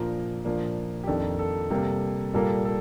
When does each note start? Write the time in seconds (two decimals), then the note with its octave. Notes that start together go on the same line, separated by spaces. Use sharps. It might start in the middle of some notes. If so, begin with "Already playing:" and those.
Already playing: A#2 F3 A#3 D4 A#4
0.45 A#2 F3 A#3 D4
1.04 G4
1.07 F2 D#3 A#3 D4 A4
1.39 A4
1.71 C3 G3 A#3 A4
2.34 A#2 G3 A#3 A4
2.65 A4